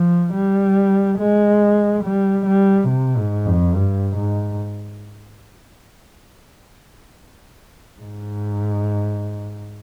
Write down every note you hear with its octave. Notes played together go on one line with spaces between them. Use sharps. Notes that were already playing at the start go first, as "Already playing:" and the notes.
Already playing: F3
G3
G#3
G3
G3
C3
G#2
F2
G2
G#2
G#2